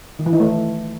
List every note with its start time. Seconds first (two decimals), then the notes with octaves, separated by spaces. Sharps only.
0.19 D#3
0.26 E3
0.33 D#4
0.40 A3